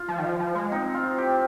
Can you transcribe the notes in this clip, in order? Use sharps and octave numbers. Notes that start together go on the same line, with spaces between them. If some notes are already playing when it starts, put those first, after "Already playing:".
Already playing: F4
F3
D#3
F3
F3
G#3
C4 D#4
F4
G4